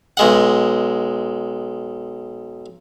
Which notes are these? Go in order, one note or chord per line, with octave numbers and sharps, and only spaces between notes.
B1 G#3 F#5